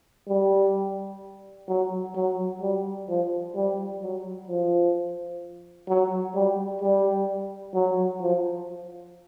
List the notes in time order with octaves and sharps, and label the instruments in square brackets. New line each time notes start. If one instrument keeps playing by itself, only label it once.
[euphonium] G3
F#3
F#3
G3
F3
G3
F#3
F3
F#3
G3
G3
F#3
F3